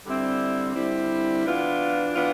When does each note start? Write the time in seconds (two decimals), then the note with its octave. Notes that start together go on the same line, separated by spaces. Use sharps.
0.06 D3 G3 C4 E4
0.76 D3 G3 C4 E4
1.45 E3 B3 D4 F4
2.15 E3 B3 D4 F4